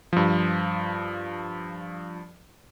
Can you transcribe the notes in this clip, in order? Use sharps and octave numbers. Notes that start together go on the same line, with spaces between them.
G2 F3